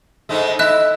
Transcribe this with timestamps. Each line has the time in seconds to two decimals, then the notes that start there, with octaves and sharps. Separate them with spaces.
0.29 G#2 G#3 A3
0.59 E4 D#5 E5 F#6